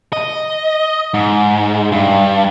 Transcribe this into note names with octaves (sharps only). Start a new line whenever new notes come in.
D#5
G#2
G2